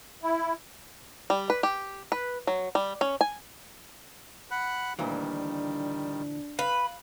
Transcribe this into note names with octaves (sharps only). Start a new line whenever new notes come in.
E4
G3
B4
G4
B4
F#3
G3
C#4
G#5
F#5 B5 F#6
D2 A#2 D#3 E3 G3 D4
B4 F5